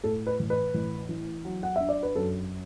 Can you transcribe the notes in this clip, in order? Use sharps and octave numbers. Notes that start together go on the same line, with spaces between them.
A2 A4
B4
A1
B4
A1
E3
F#3
F#5
D4 E5
D5
B4
F#2 A4